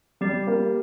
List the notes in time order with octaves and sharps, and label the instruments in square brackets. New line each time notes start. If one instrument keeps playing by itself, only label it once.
[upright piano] G3 [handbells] G4
[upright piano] A#3